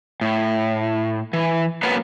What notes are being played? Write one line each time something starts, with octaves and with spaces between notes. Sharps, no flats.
A2
E3
F#3 A#3 B3 C#4 B4 F5